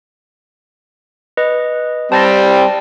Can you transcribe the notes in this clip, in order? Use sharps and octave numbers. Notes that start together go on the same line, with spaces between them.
B4 D#5
G3 C4 A5 A6 A#6